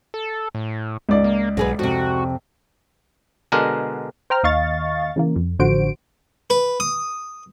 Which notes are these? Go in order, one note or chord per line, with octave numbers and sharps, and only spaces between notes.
A4
A2
C#2 D5
A#3
B1 F#3 G#4 B4
F2 C3 F#4
B2 D3 G#3 D4 A#4
C5 G5 A#5 F6
D#2 D#5 F5 C#6 A6
C#3 E3 A#3
F2
A1 D3 F3 F#4 C5 D7
B4
D#6